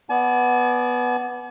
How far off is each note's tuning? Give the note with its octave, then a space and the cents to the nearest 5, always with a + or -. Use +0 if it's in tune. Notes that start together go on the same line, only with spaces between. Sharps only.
B3 +0 D5 +0 G#5 +45